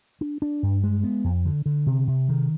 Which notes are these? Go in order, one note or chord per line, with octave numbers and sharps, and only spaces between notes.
D4
D4
G2
G#3
B3
F2
D3
D3
C3
C3
D#3